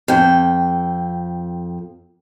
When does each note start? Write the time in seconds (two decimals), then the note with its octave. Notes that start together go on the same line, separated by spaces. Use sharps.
0.08 F2 G5